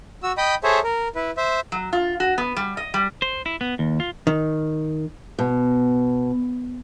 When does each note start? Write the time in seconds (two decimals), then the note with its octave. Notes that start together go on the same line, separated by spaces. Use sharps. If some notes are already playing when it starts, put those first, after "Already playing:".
0.23 F#4 E6
0.37 D#5 G5 B5 D#6
0.64 G#4 A4 C5 C#5 E5
0.84 A#4
1.15 E4 B4
1.37 C5 E5
1.72 F#3
1.93 F4
2.20 F#4
2.38 B3
2.56 G3
2.77 D#5
2.94 G3
3.22 C5
3.46 E4
3.61 B3
3.79 D#2
4.00 F4
4.27 D#3
5.39 B2